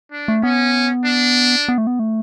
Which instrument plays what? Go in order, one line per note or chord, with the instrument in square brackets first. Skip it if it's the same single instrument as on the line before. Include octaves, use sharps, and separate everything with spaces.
[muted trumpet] D4
[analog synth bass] A3
[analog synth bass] B3 [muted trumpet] C#4
[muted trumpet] D4
[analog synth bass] B3
A3
B3
A3